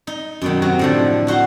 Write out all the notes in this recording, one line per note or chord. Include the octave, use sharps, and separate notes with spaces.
D#4
F#2 B2 D#3
C3 F#3 F#4
A2 D3 F3
D#4 F#4 C5 F#5